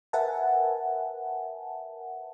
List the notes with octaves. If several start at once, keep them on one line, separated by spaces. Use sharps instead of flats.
A#4 B4 E5 F#5 G#5 A5